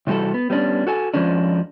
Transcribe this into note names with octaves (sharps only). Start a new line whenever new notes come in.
C3 E3 G3 F#4 A4
B3
G3 B3 C#4 D4
F#4 A4 G#5
F2 A#2 F3 G#3 C#4 D4